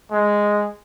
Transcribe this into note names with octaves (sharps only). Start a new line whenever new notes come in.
G#3